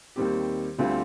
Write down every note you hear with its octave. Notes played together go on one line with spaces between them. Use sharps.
D#2 D#3 G3 C4 G4
D2 D3 G3 C4 F4